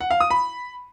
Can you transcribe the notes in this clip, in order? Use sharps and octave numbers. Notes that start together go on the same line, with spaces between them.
F#5
F5
D#6
B5